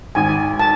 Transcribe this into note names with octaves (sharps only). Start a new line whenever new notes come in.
G#1 G#5
A5